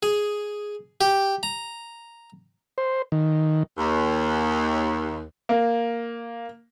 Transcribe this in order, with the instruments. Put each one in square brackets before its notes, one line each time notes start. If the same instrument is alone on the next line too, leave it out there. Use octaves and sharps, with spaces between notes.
[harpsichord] G#4
G4
A#5
[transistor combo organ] C5
D#3
[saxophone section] D#2
[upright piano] A#3